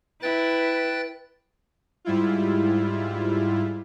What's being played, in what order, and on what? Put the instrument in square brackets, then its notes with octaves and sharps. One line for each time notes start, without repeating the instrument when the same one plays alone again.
[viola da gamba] E4 [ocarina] B4 [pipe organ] G5 F#6 A6
[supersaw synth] G#2 G3 E4 F4